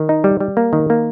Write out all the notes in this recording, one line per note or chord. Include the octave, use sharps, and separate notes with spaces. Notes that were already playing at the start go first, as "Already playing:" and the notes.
Already playing: D#3
D#4
G3
G3
A#3
D#3
A#3